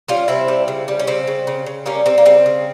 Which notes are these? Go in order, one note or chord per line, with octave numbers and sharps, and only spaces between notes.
G3 C#4 F4
C3 C4 E4
G3
C#3
G3
C#4
C#3 C4
C#3
C#3
C#3
G3 A#3 C#4
G3 C4
A#3
C#3 C4
C#3